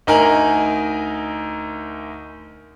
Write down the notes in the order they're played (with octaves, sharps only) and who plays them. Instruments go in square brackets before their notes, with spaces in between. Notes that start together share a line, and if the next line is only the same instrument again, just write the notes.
[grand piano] D2 D#4 A#4 D#5 G#5 F#7